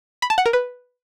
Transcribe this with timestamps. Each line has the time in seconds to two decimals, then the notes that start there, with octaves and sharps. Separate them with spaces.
0.22 B5
0.30 A5
0.38 F#5
0.46 A#4
0.53 B4